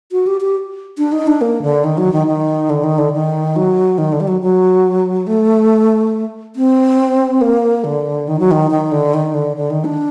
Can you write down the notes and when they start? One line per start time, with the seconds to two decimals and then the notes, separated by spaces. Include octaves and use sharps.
0.12 F#4
0.27 G4
0.41 G4
0.98 D4
1.12 D#4
1.27 D4
1.41 A#3
1.62 D3
1.84 D#3
1.98 F#3
2.12 D#3
2.27 D#3
2.70 D3
2.84 D#3
2.98 D3
3.13 D#3
3.56 F#3
3.98 D#3
4.12 D3
4.20 G3
4.28 F#3
4.41 F#3
5.27 A3
6.56 C4
7.41 A#3
7.84 D3
8.28 D#3
8.39 F#3
8.51 D#3
8.71 D#3
8.92 D3
9.14 D#3
9.34 D3
9.56 D3
9.70 D#3
9.85 D4